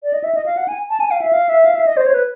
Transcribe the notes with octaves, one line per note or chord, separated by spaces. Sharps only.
D5
D#5
E5
D#5
F5
F#5
G#5
A5
G#5
F5
E5
F5
E5
F5
E5
D#5
C5
C#5
B4